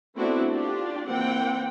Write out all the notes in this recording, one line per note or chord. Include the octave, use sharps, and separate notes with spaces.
A3 B3 C4 D4 E4 F#4
D4 F4 G4 D5
E3 A#3 C4 F#5 G5